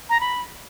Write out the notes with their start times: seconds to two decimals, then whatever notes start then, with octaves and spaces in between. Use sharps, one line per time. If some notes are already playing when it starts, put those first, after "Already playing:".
0.09 A#5
0.20 B5